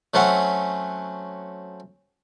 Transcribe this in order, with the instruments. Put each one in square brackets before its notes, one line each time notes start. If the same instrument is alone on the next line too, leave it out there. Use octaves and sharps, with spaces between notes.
[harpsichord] F#3 A3 C4 C#4 B4 F#5